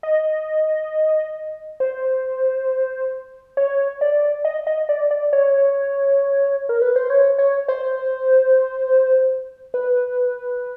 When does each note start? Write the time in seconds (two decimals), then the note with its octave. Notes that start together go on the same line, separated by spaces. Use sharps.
0.03 D#5
1.80 C5
3.57 C#5
4.01 D5
4.45 D#5
4.67 D#5
4.89 D5
5.11 D5
5.33 C#5
6.69 A#4
6.82 B4
6.96 C5
7.10 C#5
7.38 C#5
7.68 C5
9.74 B4